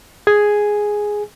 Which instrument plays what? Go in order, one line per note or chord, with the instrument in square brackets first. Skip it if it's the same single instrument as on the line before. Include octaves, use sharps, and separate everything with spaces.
[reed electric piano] G#4 G#5